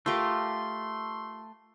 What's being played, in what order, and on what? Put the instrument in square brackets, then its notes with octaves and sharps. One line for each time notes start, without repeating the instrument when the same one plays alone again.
[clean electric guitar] A3 [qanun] F4 G4 A#4 [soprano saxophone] C6